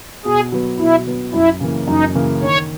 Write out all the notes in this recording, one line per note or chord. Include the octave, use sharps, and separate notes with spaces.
B2 G#4
F#3 B3
B2 E4
F#3 B3
F#2 E4
C#3 E3 A#3
F#2 D#4
C#3 E3 A#3
D#3 C#5